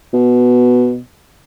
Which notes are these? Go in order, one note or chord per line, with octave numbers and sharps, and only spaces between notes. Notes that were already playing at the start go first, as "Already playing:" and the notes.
B2